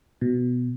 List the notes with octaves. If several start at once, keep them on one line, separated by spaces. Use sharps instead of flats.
B2